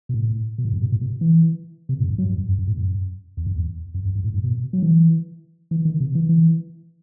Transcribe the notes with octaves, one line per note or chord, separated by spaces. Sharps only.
B2
A2
B2
A2
G2
B2
A2
B2
E3
C3
A2
F#2
G2
F#3
G2
F#2
F#2
F#2
A2
F#2
E2
F#2
E2
F#2
F#2
G2
A2
G2
B2
F#3
E3
E3
D#3
C3
E3
E3